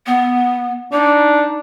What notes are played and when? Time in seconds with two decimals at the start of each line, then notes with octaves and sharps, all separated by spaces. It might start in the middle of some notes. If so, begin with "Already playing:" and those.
0.07 B3
0.93 D4 D#4